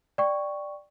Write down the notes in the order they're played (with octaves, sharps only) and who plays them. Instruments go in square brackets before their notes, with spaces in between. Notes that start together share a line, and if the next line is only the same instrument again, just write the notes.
[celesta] D5 G5 C#6